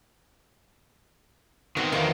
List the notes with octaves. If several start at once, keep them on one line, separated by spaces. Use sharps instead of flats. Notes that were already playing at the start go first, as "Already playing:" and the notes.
D#3 B3 C4 F#4
E2 D#3 F3 A#3